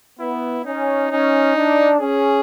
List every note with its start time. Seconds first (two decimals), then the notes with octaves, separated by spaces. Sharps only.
0.19 B3 E4
0.65 C#4 D#4
1.11 C#4 D#4
1.56 D4
2.00 C#4 G#4